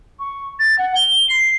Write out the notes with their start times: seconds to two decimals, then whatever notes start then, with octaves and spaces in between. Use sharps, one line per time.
0.20 C#6
0.60 A6
0.79 F#5
0.96 G7
1.29 C7